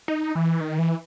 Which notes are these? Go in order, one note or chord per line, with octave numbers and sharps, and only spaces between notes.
D#4
E3
D#3
E3